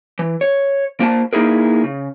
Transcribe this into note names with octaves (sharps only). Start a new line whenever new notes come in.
E3
C#5
A#3 F4 C5 F#5 A5
A#3 D#4 E4 G#4 A#4
C#3